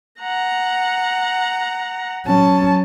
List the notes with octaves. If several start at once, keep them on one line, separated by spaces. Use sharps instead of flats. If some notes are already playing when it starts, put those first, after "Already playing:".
F#5 A#5
F#3 C#4 A5